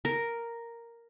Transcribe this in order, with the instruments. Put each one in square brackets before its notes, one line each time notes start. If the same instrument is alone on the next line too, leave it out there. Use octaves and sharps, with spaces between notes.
[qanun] A#4